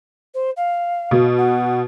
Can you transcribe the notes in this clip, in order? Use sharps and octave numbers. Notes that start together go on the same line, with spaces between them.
C5
F5
B2
F#5